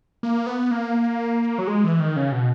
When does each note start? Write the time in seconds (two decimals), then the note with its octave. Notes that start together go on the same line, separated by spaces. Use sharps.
0.23 A#3
0.47 B3
0.71 A#3
1.58 F#3
1.67 G#3
1.84 E3
2.00 D#3
2.16 C#3
2.32 B2